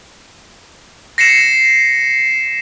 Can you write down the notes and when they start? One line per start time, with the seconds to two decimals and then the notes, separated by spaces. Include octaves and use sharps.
1.18 A#6 C7 C#7 E7